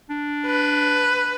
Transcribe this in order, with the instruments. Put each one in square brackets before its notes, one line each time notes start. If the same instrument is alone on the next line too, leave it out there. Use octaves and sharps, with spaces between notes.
[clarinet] D4
[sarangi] B4